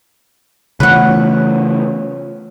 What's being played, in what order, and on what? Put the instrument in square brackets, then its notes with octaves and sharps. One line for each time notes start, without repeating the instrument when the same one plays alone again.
[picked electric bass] C#3 E3 A3 [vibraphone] C#4 F4 C#5 [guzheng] B4 F#5